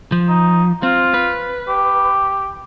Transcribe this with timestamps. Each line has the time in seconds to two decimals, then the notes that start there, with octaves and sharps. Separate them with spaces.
0.12 F3
0.29 D#4
0.83 C4 F4
1.14 B4
1.68 G4